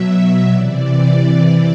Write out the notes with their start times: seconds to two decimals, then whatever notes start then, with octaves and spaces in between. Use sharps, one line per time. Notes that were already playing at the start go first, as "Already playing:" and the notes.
Already playing: B2 F#3 E5
0.52 C3 E3 D5